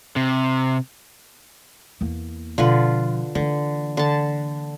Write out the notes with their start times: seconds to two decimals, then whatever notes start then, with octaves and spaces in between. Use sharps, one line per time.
0.16 C3
2.01 E2 A#3
2.58 B2 D3 F3 F4 B4
3.35 D3 E3 A#3
3.97 D3 A5